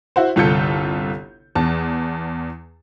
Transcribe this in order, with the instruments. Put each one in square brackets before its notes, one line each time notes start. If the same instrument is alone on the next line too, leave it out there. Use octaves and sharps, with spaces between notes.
[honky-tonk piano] E4 F#4 C5
G1 C2 F4 A4 G6 C#7
E2 A5